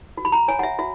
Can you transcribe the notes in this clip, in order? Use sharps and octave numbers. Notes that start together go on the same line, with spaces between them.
F#4
B5
A#5
C#5 G#5
F#5
E5
F#4 E5